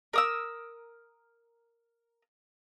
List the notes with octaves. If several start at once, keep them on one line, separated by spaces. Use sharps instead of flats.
A#4 D#6 E6